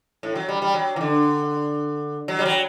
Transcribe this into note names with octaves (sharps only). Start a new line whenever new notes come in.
A2
F#3
G3
G3
F#3
E3
D3
F#3
G3
F#3